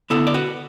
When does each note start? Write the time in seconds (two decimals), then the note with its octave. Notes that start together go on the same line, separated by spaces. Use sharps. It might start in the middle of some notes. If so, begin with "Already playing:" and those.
0.10 D3 B3 E4 A4
0.27 D5
0.34 F#4 B4